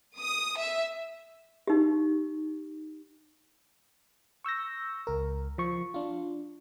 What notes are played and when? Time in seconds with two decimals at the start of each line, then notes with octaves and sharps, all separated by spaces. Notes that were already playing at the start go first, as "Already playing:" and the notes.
0.18 D#6
0.57 E5
1.67 D#4 G4
4.44 C#6 E6 G6 A#6
5.07 C#2 A#4
5.58 F3 C#6
5.94 D4 F4